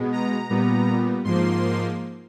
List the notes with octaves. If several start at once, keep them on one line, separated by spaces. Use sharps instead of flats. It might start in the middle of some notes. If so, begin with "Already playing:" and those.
Already playing: B2 G#3 B3
A#5
A#2 G3 B3
G#2 F3 A#3 C6